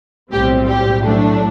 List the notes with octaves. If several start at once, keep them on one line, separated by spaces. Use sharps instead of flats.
B1 A2 G3 C4 G4
G4
A2 F#3 A3 D4